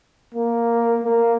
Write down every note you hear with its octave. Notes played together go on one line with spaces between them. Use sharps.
A#3
A#3